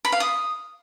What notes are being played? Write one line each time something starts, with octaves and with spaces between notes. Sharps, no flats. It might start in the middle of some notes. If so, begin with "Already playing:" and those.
B5
F5
D#6